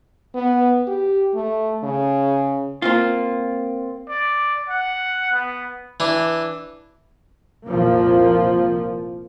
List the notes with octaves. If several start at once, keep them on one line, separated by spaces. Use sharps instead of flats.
B3
G4
A3
C#3
A#3 C4 F4
D5
F#5
B3
E3 D4
C2 F2 A#2 F3 A#3